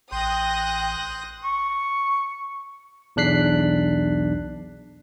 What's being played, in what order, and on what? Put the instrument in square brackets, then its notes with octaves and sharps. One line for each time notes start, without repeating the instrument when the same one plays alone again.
[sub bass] A1 [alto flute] G5 [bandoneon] C6 G6 [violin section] D#6 F#6 A#6
[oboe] C#6
[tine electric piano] B1 E2 D4 F#6 B6 C7